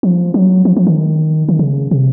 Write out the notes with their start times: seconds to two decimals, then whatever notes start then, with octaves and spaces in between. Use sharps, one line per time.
0.03 F3
0.34 F#3
0.65 F3
0.77 F3
0.87 D#3
1.49 D#3
1.59 C#3
1.91 C3